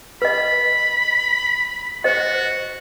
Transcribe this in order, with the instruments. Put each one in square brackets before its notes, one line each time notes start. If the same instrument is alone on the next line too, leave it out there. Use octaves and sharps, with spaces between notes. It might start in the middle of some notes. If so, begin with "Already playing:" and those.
[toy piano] B4 D#5 [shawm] B5
[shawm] F#4 [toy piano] C5 D#5